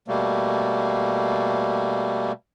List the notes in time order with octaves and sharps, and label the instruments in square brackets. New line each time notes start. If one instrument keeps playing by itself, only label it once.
[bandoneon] B2 G3 A3 A#3